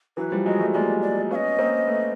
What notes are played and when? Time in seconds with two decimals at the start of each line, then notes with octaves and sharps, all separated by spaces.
0.17 E3 F#3 B4
0.31 F3 G3
0.46 F#3 G#3 D#5
0.60 G3 A3
0.74 G#3 A#3 D5
1.02 D5
1.31 B3 C#4 F5
1.35 D#5
1.59 A#3 C4
1.87 A3 B3